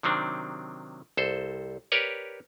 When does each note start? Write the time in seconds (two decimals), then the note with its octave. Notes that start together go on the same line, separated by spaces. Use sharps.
0.03 C3 D#3 F#3 C4 D4
1.17 C2 A4 C5
1.92 G4 A#4 B4 C#5 D5